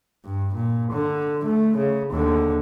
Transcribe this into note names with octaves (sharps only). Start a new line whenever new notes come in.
G2
A#2
D3
A3
C#3
D#2 D3